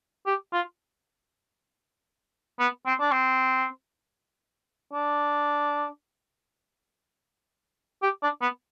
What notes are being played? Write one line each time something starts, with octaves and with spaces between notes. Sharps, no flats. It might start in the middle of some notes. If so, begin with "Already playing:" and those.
G4
F4
B3
C4
D4
C4
D4
G4
D4
B3